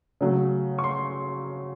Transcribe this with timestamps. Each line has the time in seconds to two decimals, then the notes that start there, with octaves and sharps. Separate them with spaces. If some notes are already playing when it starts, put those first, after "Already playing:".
0.21 C#3 F#3 A3
0.79 C#6
0.84 C6